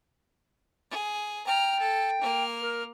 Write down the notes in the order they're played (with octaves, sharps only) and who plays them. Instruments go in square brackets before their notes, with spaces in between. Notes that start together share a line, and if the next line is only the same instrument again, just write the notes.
[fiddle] G#4
[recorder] G5 [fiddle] A#5 F6
[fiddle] A4
A#3 F6
[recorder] A#4